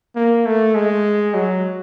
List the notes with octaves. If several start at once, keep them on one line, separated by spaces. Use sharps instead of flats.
A#3
A3
G#3
F#3